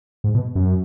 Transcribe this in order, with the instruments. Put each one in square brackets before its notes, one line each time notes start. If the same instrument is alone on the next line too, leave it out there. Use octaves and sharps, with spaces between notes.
[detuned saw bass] G#2
B2
F#2